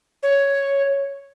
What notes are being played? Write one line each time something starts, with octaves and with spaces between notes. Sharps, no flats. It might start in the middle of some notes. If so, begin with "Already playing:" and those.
C#5